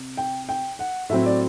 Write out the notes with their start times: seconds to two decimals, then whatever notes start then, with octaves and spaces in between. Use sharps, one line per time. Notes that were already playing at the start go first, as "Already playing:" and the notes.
Already playing: C3
0.17 G5
0.49 G5
0.79 F#5
1.09 A2 F#3 C4 E5
1.26 D5